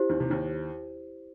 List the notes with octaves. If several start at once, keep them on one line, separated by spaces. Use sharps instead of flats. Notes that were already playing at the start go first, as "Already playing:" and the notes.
Already playing: E4 G4 C5
D#2 D#3
C3
D#2 D#3